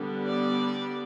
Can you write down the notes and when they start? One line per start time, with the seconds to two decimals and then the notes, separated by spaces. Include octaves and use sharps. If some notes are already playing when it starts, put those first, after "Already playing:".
Already playing: D3 G3 B3
0.26 D5